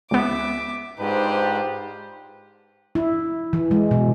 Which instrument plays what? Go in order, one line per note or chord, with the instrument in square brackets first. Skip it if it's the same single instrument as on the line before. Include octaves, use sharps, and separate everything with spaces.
[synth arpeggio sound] C#2 B3 [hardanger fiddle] E5 D6
[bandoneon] G#2 [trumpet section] D4 F4 B4 [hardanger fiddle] G4 C5
[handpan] E4
E3
G#3
B2